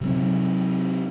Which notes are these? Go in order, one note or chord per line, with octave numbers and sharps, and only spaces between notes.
C3 F#3 C4